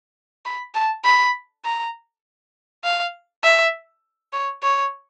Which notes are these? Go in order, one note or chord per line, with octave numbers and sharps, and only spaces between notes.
B5
A5
B5
A#5
F5
E5
C#5
C#5